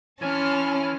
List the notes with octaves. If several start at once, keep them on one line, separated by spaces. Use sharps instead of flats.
E3 C#4 C#5 G#5 A5 C6 F6